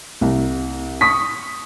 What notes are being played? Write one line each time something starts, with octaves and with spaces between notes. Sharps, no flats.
C2
C#6 D#6 B6